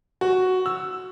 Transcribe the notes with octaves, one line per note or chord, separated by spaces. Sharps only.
F#4
E6